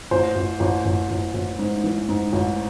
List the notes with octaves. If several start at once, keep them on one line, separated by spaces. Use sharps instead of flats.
A1 C5
A1
A1
A1
A1
A1
G#2
E3
G#2
A1